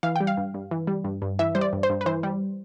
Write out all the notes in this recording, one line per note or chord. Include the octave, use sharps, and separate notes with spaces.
E3 F5
G3 G5
F5
G2
G2
E3
G3
G2
G2
E3 E5
G3 C5
D5
G2
C5
G2
B4
E3 C5
G3